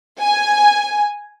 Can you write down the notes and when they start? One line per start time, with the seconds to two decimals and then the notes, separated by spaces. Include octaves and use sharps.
0.20 G#5